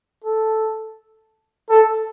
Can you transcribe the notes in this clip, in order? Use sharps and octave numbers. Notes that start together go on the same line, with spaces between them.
A4
A4